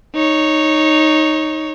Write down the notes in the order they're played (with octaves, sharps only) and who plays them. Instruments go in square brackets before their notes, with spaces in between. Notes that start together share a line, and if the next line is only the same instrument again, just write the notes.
[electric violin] D#4 C#5